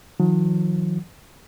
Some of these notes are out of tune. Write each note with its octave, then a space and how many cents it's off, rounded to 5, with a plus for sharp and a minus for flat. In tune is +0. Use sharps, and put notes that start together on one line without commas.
D#3 +30 F#3 -45